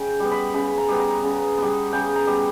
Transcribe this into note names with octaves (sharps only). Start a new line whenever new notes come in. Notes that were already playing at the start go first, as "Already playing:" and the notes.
Already playing: C#3 G5
G3 B3
B5
C#3 B5
A#5
G3 B3
A#5
C#3
G3 B3
C#3 G5
A#5
G3 B3